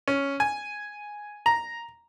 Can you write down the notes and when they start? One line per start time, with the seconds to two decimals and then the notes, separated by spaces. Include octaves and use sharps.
0.08 C#4
0.40 G#5
1.46 A#5